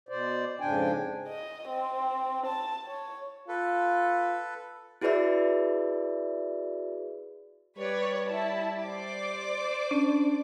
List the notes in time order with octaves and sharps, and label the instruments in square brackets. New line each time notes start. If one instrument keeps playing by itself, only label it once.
[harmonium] B2 C5 D5
F2 G#2 C#3 D4 G5 G#5
[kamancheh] D#5
C4
A5
C#5
[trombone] F4 [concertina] A4 B4
[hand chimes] E4 F#4 G#4 B4 D5 E5
[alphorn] G3 [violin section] B4 C#5 D5
[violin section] E4 A5
C5 D5 D6
[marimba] C#4 [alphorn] D4